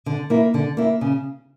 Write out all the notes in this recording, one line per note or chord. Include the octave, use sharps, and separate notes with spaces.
D3
A#3 E4
D3
A#3 E4
C#3